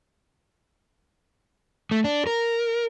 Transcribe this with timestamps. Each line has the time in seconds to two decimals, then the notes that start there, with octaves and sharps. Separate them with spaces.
1.91 A3
2.04 D4
2.27 A#4